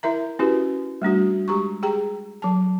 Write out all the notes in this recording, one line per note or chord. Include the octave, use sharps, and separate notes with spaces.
E4 A#4 E5 A#5
C#4 E4 F#4 G4 B4
G3 A3 D4 F#4
G#3 G4 A#5 C#6
G4 G#4 G5 A#5
F#3 A5